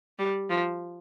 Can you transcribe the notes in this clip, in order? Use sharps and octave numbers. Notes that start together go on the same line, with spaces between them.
G3
F3